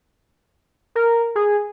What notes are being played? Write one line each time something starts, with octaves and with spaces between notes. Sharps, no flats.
A#4
G#4